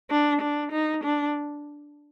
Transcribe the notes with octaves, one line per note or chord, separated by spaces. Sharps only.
D4
D4
D#4
D4